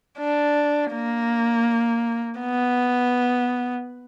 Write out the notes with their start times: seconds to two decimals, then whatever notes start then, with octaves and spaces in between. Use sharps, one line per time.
0.19 D4
0.93 A#3
2.40 B3